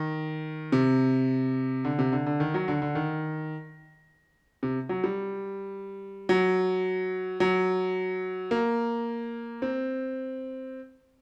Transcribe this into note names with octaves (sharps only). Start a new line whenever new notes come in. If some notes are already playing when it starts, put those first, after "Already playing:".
Already playing: D#3
C3
D3
C3
D3
D3
D#3
F#3
D3
D3
D#3
C3
F#3
G3
F#3
F#3
A#3
C4